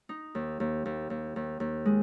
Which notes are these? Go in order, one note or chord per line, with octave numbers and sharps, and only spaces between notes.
D#4
D#2
D#2
D#2
D#2
D#2
D#2
G#3